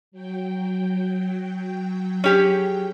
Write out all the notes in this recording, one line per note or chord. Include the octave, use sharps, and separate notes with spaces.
F#3 G5
C#4 G4 G#4